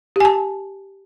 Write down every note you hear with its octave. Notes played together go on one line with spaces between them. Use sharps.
G4 G#5 A5